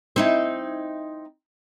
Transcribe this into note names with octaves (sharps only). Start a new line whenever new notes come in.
C4 D#4 E4